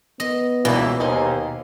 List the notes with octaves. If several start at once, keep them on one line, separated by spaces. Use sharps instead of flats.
B3 D#5
C#2 B2 E3 G3 A#3 D4
D#2 D#4 G#4 C5